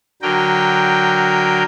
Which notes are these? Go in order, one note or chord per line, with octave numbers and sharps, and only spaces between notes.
D3 F#3 A#4 G5